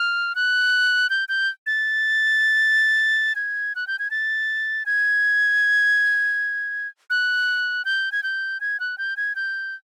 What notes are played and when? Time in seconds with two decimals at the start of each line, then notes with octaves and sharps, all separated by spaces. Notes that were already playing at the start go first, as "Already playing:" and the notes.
Already playing: F6
0.35 F#6
1.10 G6
1.29 G6
1.67 A6
3.36 G#6
3.76 F#6
3.87 G6
3.99 G#6
4.11 A6
4.86 G#6
7.10 F#6
7.85 G6
8.12 G#6
8.23 G6
8.61 G#6
8.80 F#6
8.98 G6
9.17 G#6
9.36 G6